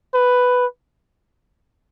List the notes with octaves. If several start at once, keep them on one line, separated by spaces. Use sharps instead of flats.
B4